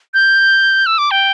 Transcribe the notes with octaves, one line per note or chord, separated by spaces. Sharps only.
G6
E6
D6
G5